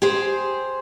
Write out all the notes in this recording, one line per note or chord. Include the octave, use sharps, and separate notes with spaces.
G4 G#4 C5